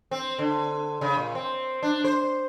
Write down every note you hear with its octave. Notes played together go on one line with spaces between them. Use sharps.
C4
D3
C#3
A#2
C4
D4
C5